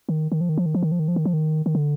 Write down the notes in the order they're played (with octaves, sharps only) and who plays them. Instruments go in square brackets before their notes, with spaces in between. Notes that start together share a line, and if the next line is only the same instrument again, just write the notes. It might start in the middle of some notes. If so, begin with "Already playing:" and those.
[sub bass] D#3
D#3
F3
D#3
F3
D#3
F3
D#3
F3
D#3
F3
D#3
F3
D#3
D#3
D3